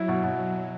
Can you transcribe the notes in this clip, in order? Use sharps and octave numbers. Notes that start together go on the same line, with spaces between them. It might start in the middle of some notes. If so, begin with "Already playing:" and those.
Already playing: F#3 E4
B2
B2